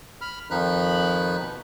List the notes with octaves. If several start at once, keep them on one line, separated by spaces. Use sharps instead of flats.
B5 F6
F2 D#3 F3 D#4 B5 F#6
B2